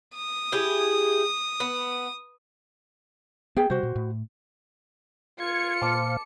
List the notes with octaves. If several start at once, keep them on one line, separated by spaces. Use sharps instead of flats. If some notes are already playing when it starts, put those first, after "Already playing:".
D#6
E4 G4 G#4
B3
B3 G#4 G5
C3 G3 F#4 C5
A#2
A2
F4 G#6 C#7
A#2 C5 F5 A5 D6